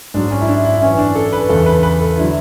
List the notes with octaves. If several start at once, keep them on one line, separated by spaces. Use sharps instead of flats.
G#2 F#3 D4
C#4
E4
D4
E4
F#2 E3 C#4
D4
A4
B4
E2 C#3 E3 A4
B4
B4
A4
D3 F#3 E4